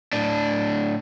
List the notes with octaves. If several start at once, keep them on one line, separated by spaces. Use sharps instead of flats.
A2 D4